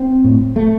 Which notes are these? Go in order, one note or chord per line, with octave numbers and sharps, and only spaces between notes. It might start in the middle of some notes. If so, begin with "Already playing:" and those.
Already playing: C4
A2
A3